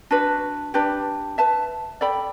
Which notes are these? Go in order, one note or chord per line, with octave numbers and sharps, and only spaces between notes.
D4 F#4 B4
D4 G4 B4
B4 E5 A5
A4 D5 G5 B5